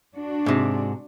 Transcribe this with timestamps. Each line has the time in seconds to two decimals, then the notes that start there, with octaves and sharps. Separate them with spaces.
0.15 D4 F#4
0.46 G#2 C3